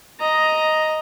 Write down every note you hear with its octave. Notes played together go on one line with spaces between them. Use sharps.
D#5 A#5